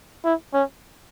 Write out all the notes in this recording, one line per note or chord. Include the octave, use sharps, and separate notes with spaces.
E4
C#4